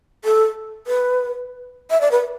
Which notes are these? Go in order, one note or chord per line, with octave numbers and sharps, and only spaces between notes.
A4
B4
E5
D5
B4